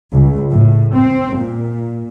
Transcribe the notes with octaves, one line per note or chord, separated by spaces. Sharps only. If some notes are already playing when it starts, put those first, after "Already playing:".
C#2
A2
C4
A#2